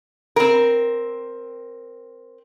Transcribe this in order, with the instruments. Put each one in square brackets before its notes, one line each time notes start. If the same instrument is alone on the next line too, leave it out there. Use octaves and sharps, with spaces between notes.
[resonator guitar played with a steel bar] C4 A#4